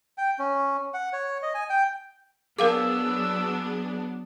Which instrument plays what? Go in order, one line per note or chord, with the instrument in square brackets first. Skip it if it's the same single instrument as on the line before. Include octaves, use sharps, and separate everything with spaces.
[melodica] G5
C#4
F#5
C#5
D#5
G#5
G5
[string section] F#3 B3 D4 [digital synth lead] G#4 [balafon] A#4 F5 D6 [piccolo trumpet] E6